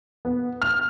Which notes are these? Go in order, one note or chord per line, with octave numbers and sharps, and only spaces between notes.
B3
F6